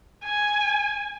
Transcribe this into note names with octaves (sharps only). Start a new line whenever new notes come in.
G#5